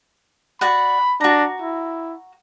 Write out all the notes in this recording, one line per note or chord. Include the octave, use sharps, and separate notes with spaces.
F#4 D5 F#5 B5
D4 F#4 A#5
E4